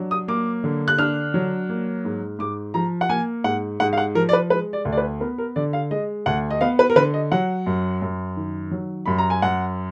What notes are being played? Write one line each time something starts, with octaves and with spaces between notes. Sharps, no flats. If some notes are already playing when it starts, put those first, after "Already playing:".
Already playing: F#3 D4
D#6
A#3 D6
D3
F#6
D4 F6
F#3
A#3
G#2
G#2 D6
F3 A#5
F#5
A#3 G#5
G#2 F#5
G#2 F#5
F5
F#5
F3 A#4
D5
B4
G#3 B4
D5
D2
D5
B4
B3 A#4
A#4
D3 D5
F5
G#3 D#5
D2 F#5
D#5
B3 F5
B4
A#4
D3 B4
D#5
F#3 F#5
F#2
F#2
D#3
F#3
F#2 B5
A#5
G#5
F#2 F#5